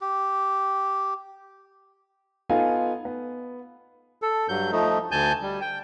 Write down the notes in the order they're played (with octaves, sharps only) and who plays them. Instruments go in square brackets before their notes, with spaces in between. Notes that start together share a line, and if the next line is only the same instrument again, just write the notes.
[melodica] G4
[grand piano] B3 D#4 F4 A4 F5 G#5
B3
[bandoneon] A4
G2 F#3 G6
F3 A3 D#4
D2 G#5 A5 G6
G3
G5